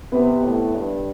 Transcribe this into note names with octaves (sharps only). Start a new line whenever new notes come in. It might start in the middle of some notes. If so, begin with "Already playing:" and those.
C3 B3 B4
A2
G2